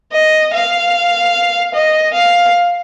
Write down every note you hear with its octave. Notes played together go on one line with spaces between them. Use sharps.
D#5
F5
D#5
F5